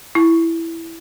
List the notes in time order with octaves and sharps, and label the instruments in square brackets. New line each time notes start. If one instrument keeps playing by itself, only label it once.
[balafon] E4